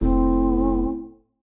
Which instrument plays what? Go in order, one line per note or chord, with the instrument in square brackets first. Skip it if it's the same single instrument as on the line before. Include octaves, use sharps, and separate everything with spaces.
[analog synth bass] F1 [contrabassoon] A2 [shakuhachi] C4